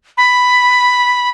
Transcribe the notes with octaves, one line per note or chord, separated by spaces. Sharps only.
B5